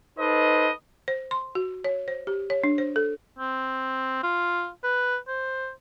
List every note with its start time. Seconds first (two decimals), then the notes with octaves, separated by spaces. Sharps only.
0.18 D#4 A4 B4 C5 D#5
1.08 C5
1.31 C6
1.55 F#4
1.84 C#5
2.08 C5
2.27 G4
2.50 C#5
2.64 D4
2.78 C5
2.96 A4
3.38 C4
4.23 F4
4.83 B4
5.28 C5